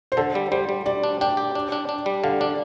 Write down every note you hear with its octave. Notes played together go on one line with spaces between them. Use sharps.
C5
D3 A4
G3
G3 C5
G3
G3 D5
D4
D4 G5
G4
D4
D4
D4
G3
D3 F5
D4 D5